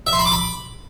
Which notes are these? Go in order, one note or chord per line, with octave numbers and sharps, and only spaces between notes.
E5
C6
B5
D6
B5